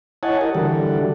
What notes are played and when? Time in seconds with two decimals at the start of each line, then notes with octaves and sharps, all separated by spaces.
0.23 E4 C#5 D#5 F#5 G#5 A5
0.41 G4 A#4 D#5
0.55 D3 E3 G3 F#4 A4